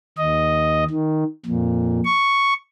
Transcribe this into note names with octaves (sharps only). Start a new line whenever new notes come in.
D#2 D#5
D#3
F2 A#2
C#6